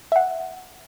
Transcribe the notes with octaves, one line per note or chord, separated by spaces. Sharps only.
E5
F#5